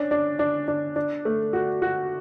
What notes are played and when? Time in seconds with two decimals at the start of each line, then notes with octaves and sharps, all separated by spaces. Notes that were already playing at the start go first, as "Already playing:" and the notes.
Already playing: C#4 D4
0.11 D4
0.39 D4
0.68 D4
0.96 D4
1.25 A3
1.53 F#4
1.82 F#4